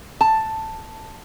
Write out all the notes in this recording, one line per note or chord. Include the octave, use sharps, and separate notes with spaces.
A5